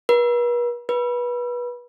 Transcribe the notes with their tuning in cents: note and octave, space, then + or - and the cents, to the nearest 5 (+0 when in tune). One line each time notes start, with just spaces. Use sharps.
B4 -45
B4 -25